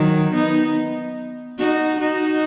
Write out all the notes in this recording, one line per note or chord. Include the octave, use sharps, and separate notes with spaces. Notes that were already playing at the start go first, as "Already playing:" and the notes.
Already playing: D#3 F#3
B3 D#4
D#4 F#4
D#4 F#4